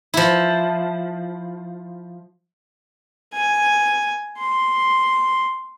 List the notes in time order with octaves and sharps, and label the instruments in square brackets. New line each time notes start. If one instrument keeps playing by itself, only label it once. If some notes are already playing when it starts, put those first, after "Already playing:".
[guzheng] F3 E4
[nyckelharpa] G#5
C6